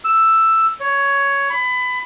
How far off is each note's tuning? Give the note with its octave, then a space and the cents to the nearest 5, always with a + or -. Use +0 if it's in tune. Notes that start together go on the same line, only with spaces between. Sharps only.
E6 +5
C#5 +10
B5 +25